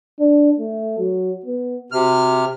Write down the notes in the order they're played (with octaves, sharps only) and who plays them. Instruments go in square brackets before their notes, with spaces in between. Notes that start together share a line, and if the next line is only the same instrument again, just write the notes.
[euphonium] D4
A3
F#3
B3
[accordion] C3 F6 [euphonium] F#4